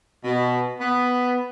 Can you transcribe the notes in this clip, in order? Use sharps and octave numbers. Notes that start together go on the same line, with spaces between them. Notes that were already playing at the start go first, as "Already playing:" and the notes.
B2
B3